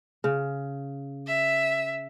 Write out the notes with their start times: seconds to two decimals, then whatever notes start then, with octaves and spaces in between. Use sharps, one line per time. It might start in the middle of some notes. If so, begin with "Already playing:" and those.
0.24 C#3
1.27 E5